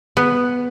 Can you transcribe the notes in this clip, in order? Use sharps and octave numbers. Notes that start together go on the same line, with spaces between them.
B3